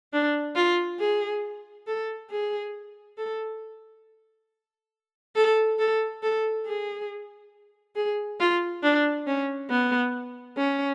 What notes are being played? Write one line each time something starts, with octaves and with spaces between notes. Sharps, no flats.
D4
F4
G#4
A4
G#4
A4
A4
A4
A4
G#4
G#4
F4
D4
C#4
B3
C#4